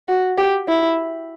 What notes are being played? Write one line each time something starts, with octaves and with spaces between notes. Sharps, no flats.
F#4
G4
E4